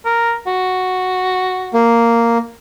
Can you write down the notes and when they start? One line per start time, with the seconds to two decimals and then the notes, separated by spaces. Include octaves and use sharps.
0.05 A#4
0.47 F#4
1.74 A#3